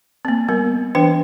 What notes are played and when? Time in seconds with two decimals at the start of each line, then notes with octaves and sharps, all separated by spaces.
0.25 A#3 C4
0.49 G3 B3 A#4
0.95 E3 D4 B4 C5 G5